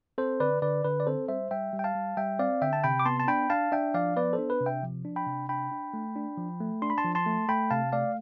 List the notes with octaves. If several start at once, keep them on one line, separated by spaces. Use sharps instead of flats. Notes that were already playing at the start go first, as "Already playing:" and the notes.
C4 A4 C5
D3 B4 D5
D3 B4 D5
D3 B4
D5
C4 A4 C5
G3 C5 E5
G3 E5 G5
G3
G5
F5 A5
G3
G3 E5 G5
C4 D5 F5
D3 E5 G5
A5
C3 G5 B5
D6
B3 A5 C6
A5
D4 G5 B5
D4 F5 A5
D4 E5 G5
F3 D5 F5
B3 B4 D5
A4 C5
D4
B4
C3
E5 G5
F3
D4
G5 B5
C3
D4 G5 B5
D4
A3
D4
F3
A3
D4 C6
B5
A5 C6
F3
A5 C6
A3
A3 G5 B5
C3 F5 A5
A3 D5 F5